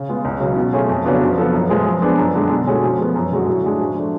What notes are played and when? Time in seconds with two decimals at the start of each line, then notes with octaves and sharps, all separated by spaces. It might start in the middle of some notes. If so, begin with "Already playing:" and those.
Already playing: C#3
0.09 G#3 B3 F4
0.25 C#2
0.40 C#3 F#3
0.56 B2
0.73 A3 C#4 F4 G#4
0.89 F2
1.05 C#3 F#3 B3 D4
1.22 F3
1.38 B3 F4 A4
1.53 F#2
1.69 F3 G#3 B3
1.86 F3
2.02 B3 D4 G#4
2.18 F#2
2.34 D3 G#3 D4
2.50 B2
2.67 G#3 C#4 F#4 A4
2.83 F3
2.98 G#3 B3
3.16 F#2
3.31 D3 G#3 C#4 F#4
3.47 A2
3.64 G#3 D4 F#4
3.79 F3
3.96 A3 D4